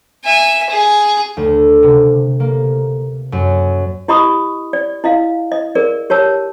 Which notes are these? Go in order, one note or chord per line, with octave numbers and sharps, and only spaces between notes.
E5 G#5
G#4
D2
C3
A#3
F#2
E4 G4 D#5 B5 C#6 D#6
D5
E4 D#5 F5
D#5
G#4 A#4 D5
G4 C#5 A5 E6